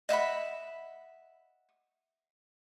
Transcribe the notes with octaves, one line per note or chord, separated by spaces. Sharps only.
D#5 E5 F#5 B5